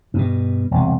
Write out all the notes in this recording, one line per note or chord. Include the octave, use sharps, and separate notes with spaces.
G2 B2
E1 C2